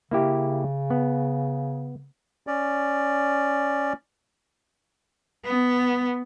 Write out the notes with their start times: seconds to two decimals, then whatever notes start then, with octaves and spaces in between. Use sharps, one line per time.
0.11 C#3 A#3 E4 G4
0.90 B3
2.47 C#4 D5
5.45 B3